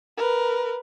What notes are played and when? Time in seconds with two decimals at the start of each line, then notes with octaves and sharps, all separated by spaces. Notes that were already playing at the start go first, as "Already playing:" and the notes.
0.18 A#4 B4